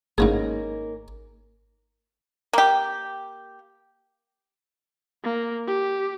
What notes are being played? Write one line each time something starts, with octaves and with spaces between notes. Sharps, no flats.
G#1 G#2 C#3 A#3 C#4 D#4 G#4
A#3 G4
A#3
G4